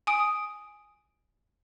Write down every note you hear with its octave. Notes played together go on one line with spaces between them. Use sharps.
G#5 D#6 D7